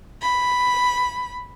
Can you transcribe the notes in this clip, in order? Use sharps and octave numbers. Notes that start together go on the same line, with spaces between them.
B5